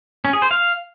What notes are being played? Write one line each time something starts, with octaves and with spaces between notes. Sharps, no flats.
C#4
G#4
C5
F5